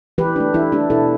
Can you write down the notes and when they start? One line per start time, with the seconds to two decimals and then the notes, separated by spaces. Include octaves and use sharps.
0.18 E3 G4 B4
0.36 A3 D4
0.54 E3 E4 A4
0.72 A3 D4 G4
0.90 B2 E4 A4